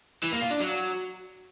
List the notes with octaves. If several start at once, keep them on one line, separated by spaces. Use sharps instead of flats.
E3
A#3
F4
D4
F#3